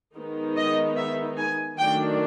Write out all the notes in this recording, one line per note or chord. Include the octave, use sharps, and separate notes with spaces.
D#3 G#3 B3 D#4
D#5
E5
G#5
D#3 F#3 A3 D4 G5